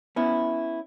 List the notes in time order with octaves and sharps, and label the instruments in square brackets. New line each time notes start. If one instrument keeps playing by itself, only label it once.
[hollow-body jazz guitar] B3 C#4 E4